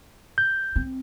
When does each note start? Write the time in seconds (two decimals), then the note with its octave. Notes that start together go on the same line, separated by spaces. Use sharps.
0.38 G6
0.76 C4